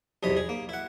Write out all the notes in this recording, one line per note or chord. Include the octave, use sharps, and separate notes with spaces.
B1 E2 C3 D#5 B5
G#4
A#3
E4 F#5